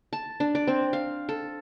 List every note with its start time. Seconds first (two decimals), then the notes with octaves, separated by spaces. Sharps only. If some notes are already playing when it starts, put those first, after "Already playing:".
0.13 A5
0.40 D4
0.55 D5
0.67 C4
0.93 F5
1.29 A4